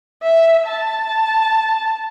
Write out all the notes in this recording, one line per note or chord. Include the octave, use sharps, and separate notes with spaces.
E5
A5